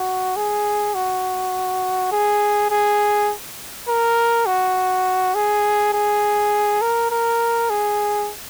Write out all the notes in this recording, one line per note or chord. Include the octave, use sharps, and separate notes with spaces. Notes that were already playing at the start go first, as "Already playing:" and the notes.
Already playing: F#4
G#4
F#4
G#4
G#4
A#4
F#4
G#4
G#4
A#4
A#4
G#4